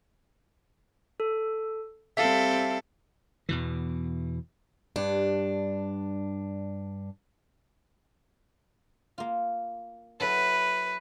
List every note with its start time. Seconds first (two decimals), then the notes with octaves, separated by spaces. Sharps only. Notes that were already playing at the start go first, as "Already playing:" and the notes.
1.20 A4
2.17 G3 C4 A4 E5 F5
3.49 E2 B2 E3
4.96 G2 D4
9.18 A#3 F4
10.20 F#3 E4 A4 B4